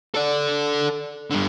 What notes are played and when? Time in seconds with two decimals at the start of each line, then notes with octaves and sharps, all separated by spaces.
0.14 A4 D5
1.30 G2 D3